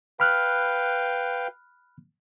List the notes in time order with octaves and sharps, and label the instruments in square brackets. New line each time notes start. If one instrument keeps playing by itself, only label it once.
[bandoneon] B4 F5 G5 [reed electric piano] B5 F6 F#6